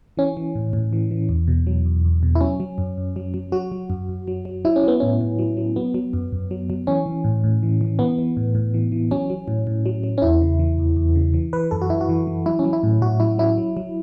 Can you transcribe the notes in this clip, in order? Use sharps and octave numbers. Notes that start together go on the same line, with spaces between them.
E3 C#4
E3
A2
A2
E3
E3
E2
B2
F#3
E2
E2
B2
E4
F#3 C#4
F#3
F#2
F#2
F#3
F#3
F#3 F#4
F#3
F#2
F#2
F#3
F#3
F#3 E4
C#4
F#3 B3
A2 C#4
A2
F#3
F#3
F#3 B3
F#3
F#2
F#2
F#3
F#3
E3 C#4
E3
A2
A2
E3
E3
E3 B3
E3
A2
A2
E3
E3
F#3 C#4
F#3
A2
A2
F#3
F#3
C#4
E2 E4
C#3
E3
E2
E2
C#3
E3
E3 B4
F#2 A4
F#4
F#2 E4
F#4
E3
E3
F#3 E4
C#4
F#3
E4
A2
A2 F#4
F#3 E4
F#3 E4
F#3
F#3